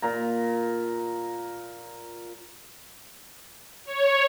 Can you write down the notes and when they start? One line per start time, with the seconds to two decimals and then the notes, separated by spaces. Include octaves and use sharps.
0.02 A#2 A#5
3.85 C#5